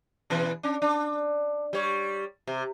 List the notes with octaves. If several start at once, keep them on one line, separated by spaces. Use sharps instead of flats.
B2 E3 B4
C#4 D4
D4
G3 C#5
C3